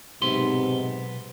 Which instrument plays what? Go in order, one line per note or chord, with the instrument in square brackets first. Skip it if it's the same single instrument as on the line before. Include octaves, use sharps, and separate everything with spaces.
[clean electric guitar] B1 B3 C6 [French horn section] G#2 C3